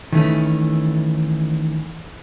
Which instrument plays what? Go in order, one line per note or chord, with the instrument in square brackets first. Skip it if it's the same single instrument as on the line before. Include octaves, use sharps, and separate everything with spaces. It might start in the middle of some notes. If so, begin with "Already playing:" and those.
[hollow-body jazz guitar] D#3 E3 A3 C#4